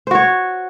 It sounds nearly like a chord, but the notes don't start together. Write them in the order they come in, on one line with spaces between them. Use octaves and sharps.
C5 F#4 C#5